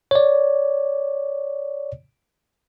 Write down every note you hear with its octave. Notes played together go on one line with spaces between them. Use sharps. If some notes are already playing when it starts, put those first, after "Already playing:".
C#5 D5